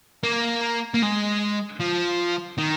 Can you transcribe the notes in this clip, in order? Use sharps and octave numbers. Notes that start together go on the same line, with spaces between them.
A#3
A#3
G#3
F3
D#3